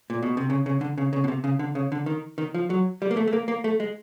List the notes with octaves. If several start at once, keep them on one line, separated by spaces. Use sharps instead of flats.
A#2
B2
C3
C#3
C#3
D3
C#3
C#3
B2
C3
C#3
D3
C#3
D3
D#3
D#3
F3
F#3
G3
A#3
A3
A3
A#3
A#3
A3
G#3